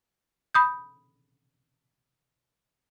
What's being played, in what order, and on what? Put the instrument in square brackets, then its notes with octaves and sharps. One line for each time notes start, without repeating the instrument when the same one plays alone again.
[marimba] B5 D#6 G6